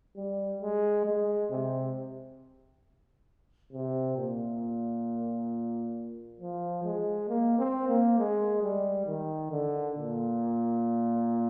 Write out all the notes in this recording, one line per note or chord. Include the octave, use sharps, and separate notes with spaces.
G3
G#3
G#3
C3
C3
A#2
F3
G#3
A#3
C4
A#3
G#3
G3
D#3
D3
A#2